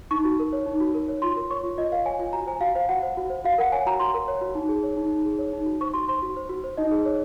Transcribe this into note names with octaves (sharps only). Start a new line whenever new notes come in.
D#4 C#6
F#4
A#4
C#5
D#4
F#4
A#4
C#5
F4 C6
A#4
C#5 C#6
F4
F4 D#5
A#4 F5
C#5 G#5
F4 G#5
F#4 A#5
C5 G#5
F#4 F5
C5 F5
F#4 F#5
C5
F#4
C5
F#4 F5
A#4 F#5
C#5 G#5
F#4 A#5
F#4 C6
A#4
C#5
F#4
D#4
G#4
C#5
D#4
D#4
G#4
C#5
D#4
F#4
C5 C#6
F#4 C6
C5 C6
F#4
C5
F#4
C5
D#4 D#5
G#4
C#5